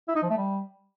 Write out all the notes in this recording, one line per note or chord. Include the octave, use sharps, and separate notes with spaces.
E4
D#4
F3
A3
G3